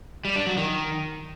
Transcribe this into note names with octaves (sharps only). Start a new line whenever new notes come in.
G3
D4
F#3
D#3